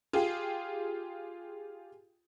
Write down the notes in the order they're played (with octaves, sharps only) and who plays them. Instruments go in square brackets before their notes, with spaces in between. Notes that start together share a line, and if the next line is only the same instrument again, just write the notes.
[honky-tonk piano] F4 G4 G#4